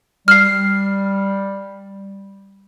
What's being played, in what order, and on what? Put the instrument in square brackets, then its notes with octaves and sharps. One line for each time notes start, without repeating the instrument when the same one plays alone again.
[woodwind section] G3 [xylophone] F6 C7